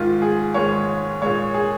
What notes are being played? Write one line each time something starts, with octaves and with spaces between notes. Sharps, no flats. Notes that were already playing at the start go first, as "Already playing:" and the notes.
Already playing: G#2 D#3 G#3 F4
G#4
G#2 D#3 G#3 C#5
A#2 G#3 C#5
G#4